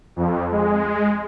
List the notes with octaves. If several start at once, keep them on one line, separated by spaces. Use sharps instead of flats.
F2
G#3